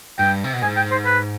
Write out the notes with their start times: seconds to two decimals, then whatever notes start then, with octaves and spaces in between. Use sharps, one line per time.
0.19 G2 G5
0.44 C3
0.53 B2
0.62 G#2 G#5
0.77 G5
0.91 C5
1.05 B4